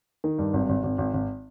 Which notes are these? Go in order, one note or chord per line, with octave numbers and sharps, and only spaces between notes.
D#3
G2
G#1
G#1
G#1
G#1
G#1